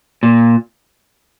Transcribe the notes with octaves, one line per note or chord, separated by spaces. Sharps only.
A#2